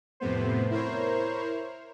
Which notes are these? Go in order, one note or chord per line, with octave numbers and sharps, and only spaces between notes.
F2 A2 C3 A3 B3 C5
E4 A#4 C5 C#5